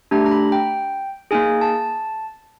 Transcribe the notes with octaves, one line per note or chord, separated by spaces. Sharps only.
A3 D4 G4 A#5
A#5
B5
G5
A#3 D#4 G#4 G#5
A5